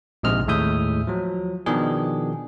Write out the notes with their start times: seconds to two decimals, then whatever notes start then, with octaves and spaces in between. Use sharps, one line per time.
0.23 A#1 G#2 C3 D#5 F6
0.47 D#2 A2 G#3 E5 D#6 G6
1.07 F3 F#3
1.66 B2 D#3 F3 D4 G#4